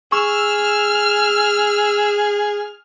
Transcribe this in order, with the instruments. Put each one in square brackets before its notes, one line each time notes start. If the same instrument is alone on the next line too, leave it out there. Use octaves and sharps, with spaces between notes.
[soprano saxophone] G#4 [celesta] C#6 [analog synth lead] E6 [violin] F6